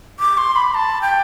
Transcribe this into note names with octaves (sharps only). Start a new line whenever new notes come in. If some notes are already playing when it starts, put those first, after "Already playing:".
D6
C6
B5
A5
G5